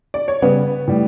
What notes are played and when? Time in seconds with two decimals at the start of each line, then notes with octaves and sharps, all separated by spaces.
0.14 D5
0.28 C#5
0.42 C#3 G3 B3 B4
0.87 A2 G3